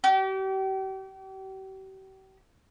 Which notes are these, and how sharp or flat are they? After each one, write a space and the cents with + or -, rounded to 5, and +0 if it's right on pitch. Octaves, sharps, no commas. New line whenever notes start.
G4 -40